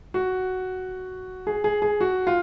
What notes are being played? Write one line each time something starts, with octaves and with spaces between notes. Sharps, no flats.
F#4
G#4
G#4
G#4
F#4
F4